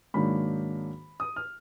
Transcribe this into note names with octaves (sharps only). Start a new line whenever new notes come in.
G#2 D#3 F#3 A#3 D4 B5
D#6
F6